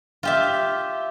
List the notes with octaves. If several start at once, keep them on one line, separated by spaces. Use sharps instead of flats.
F4 G4 E5